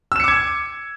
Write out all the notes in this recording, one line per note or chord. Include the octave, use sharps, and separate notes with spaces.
D6 E6 G#6 C#7 E7